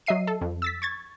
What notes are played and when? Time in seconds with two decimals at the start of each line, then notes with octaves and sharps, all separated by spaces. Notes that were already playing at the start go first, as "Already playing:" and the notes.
0.06 F#3 D#5 E5 C7 D#7
0.27 A4
0.41 F2
0.62 E6 A6 B6
0.82 C#6 G#6 A6